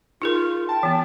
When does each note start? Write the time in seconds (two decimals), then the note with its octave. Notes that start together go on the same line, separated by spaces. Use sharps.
0.22 D#4 F4 G#4 A#4
0.69 G5 A5
0.83 E3 B3